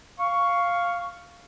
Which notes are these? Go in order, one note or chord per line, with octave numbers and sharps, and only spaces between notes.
F5 C#6